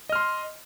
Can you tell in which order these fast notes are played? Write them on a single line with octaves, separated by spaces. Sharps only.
D#5 F6 C6